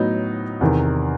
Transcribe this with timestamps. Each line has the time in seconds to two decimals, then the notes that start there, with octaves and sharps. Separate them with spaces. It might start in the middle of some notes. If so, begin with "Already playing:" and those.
Already playing: A2 F#3 B3 D#4
0.61 E2 C3 D#3